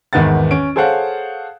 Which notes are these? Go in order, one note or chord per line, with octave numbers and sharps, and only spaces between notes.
G#1 E2 D#3 B4 F#5 A6
C#4 D7
G#4 A4 C5 C#5 F5 F#5